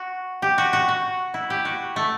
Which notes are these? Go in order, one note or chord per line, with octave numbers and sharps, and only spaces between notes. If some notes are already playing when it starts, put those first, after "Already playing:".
Already playing: F#4
G4
F#4
F#4
F#4
E4
G4
F#4
A3